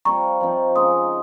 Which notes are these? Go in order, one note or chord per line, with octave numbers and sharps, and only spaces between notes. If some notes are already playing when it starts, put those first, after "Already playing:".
G3 C4 F4 A#5 C#6
F3 C4 D#4
C#3 G#3 D#4 C6 D#6